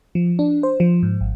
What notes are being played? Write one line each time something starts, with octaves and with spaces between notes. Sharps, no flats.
F3
D4
C5
F3
G#2
G#1